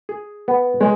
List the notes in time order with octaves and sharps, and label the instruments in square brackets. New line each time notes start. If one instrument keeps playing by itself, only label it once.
[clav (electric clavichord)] G#4
B3
[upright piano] G#3